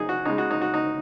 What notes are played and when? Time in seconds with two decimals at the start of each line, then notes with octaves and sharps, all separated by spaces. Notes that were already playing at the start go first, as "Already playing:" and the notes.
Already playing: F#3 D#4 G#4
0.09 F#4
0.25 C#3 G#3 D#4
0.38 F#4
0.50 D#4
0.62 F#4
0.74 D#4